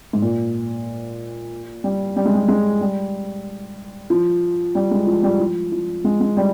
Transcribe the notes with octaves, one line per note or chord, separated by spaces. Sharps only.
G#2
A#2
G3
G3
G#3
G3
G#3
G3
F3
G3
G#3
F3
G3
F3
F3
G#3
G#3
G3